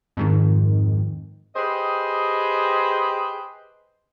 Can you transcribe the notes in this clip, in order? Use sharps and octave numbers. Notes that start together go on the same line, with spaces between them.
F2 G#2 D#3
G4 G#4 B4 C5 D#5